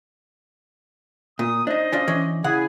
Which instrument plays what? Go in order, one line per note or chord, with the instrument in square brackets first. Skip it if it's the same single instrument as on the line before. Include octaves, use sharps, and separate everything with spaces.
[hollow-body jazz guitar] A#2 [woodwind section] D#6
[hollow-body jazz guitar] D4 D#4 [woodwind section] C5 D#5
[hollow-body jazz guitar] C#4 D4 F4
E3 C#4 D4
[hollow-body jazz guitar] C#3 F#5 [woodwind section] E4 G#4